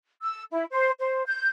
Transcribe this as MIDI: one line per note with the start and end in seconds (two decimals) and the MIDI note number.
0.22 0.43 88
0.51 0.64 64
0.71 0.91 72
0.99 1.23 72
1.27 1.48 91